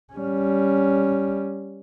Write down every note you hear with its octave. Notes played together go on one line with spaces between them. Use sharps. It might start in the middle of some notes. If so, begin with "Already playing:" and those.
G3 C#4